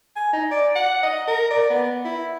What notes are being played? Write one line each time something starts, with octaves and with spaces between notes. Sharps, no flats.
G#5
D#4
D5
F#5
D#5
A#4
D5
B3
E4